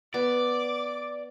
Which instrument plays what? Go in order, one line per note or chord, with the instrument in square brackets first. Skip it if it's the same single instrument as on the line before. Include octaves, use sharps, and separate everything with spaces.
[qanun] B3 [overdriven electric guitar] D5 [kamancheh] D6